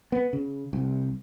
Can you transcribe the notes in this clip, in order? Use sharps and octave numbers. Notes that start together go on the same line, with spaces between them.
B3
C#3
C2